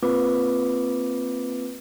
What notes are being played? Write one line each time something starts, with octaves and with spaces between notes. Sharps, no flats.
A#3 C4 F4 B4 D6